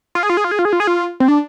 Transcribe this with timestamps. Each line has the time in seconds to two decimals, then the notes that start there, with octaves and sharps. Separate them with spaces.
0.15 F4
0.23 G#4
0.29 F4
0.37 G#4
0.44 F4
0.51 G#4
0.59 F4
0.65 G#4
0.73 F4
0.80 G#4
0.87 F4
1.20 C4
1.28 D4